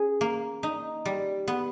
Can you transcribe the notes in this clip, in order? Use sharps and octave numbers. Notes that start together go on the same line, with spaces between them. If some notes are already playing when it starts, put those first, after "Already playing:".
Already playing: C#4 G#4
A#3
D#4
G3
B3